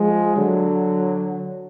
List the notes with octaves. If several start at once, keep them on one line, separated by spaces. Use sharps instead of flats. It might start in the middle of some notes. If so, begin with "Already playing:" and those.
Already playing: F3 G#3
D3 F#3